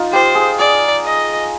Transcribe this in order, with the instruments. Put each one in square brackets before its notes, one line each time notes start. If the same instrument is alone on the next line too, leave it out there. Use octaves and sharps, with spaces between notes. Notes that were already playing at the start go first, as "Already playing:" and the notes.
Already playing: [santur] D#4 F4
[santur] G4 [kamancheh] C5
[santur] G#4
[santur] G#4 [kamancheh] D5
[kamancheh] D#5